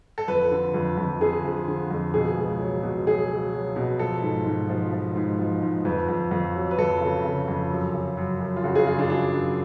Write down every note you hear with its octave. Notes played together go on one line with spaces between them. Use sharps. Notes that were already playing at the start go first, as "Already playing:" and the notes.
A4
F2 B4
D3
F2
F2
D3 G#4
F3
D3
F2
B2 G#4
C#2
F#3
B2
F#3 G#4
F#3
F#3
B2
F3 A4
G#2
G#2
F3
F3
G#2
F3
G#2
F2 B4
F2
F2
F#3
B4
F2 A4
C#3
C#3
F2
F#2
C#3
F#2
F#2
F4
C#3 F#4
G#4
F#2 F4
D4
F#3 D4
F#2